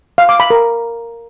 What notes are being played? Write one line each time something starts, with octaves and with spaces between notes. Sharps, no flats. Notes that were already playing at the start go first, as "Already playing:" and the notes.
F5
D6
B5
A#4